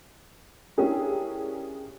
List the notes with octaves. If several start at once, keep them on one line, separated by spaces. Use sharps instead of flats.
C#4 D4 E4 G4 G#4 A#4